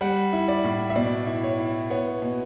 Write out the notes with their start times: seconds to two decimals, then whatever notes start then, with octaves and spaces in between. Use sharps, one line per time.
0.01 G3 F#5
0.33 E4
0.48 D5
0.64 A2
0.90 E5
0.95 B2 D5
1.27 E4
1.43 C#5
1.59 E4
1.90 B3 C#5
2.22 B2